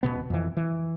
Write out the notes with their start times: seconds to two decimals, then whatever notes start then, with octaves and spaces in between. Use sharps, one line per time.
0.03 D#1 F#2 B2 B3
0.30 F2 E3
0.57 E3